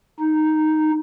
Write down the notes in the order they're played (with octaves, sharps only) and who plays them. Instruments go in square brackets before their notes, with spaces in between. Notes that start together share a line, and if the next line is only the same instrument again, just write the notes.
[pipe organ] D#4